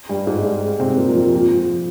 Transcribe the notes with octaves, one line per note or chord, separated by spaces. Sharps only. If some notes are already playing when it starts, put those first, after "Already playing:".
G2 G3
G#2 G#3
G#2 G#3
C3 C4
A#2 A#3
F2 F3
F2 F3
F2 F3